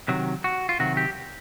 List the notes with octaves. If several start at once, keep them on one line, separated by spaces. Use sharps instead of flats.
C3 D#3 F#3
F#4
F4
C3 D#3 F#3 F#4
G4